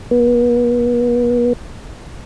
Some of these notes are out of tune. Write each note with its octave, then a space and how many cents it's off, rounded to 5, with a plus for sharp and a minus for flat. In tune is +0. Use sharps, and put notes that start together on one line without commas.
B3 -40